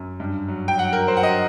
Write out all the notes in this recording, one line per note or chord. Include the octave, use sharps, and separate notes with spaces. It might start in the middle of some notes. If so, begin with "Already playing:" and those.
Already playing: F#2
G2
F#3
G5
F#3 F#5
A#4
F#3 C5
F#5
D#5